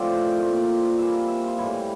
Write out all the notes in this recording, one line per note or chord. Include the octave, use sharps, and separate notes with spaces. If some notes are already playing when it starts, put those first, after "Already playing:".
Already playing: A2 F3 C4 D5 E5
C5
A#4
A#2 F3 A3 C4 A#4
D5
E3 G3 A#3 E5
E5
E5
F4
A2 E3 G3 E4
E4